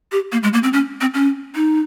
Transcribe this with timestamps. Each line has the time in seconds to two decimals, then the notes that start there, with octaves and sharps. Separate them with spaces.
0.12 G4
0.32 A#3
0.43 G#3
0.53 A#3
0.63 C4
0.73 C#4
1.01 C4
1.14 C#4
1.55 D#4